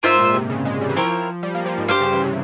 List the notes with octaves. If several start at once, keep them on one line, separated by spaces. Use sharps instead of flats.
G#2 A#3 F4 C5 E5
A#2
C3
C#3
G#3
G3
E3
F3 C4 E4 A#4 C#5
G3
A#3
F3
G#2
G2 G4 C5 F5
C#3
E3
C3